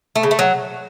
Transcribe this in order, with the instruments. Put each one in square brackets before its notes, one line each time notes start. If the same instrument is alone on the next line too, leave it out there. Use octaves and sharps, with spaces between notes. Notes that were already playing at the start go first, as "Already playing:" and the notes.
[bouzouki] A3
C#3
A3
F#3